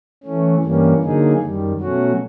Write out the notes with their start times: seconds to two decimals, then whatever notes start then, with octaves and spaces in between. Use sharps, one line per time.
0.24 E3 A3 C#4
0.63 G2 E3 G3 A#3 C#4
1.02 D3 F#3 A#3 D#4 G#4
1.41 F#2 D#3 G3
1.81 B2 F#3 A3 C#4 F#4